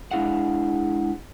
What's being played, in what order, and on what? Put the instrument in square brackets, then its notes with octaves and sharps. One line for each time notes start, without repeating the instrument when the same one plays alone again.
[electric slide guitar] G#3 D4 E4 G#4 F5 F#5